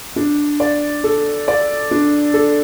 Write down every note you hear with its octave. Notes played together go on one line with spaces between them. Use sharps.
D4
D5
A4
D5
D4
A4